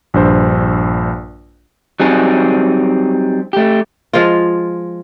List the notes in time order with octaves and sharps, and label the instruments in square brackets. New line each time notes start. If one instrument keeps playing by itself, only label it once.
[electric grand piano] A#1 G2 C5
[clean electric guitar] F#3 G3 C4 D#4 G#4
A3 G4
[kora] F3 G#3 F4